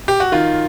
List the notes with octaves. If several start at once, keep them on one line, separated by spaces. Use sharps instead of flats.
G4
F#4
D#3 F4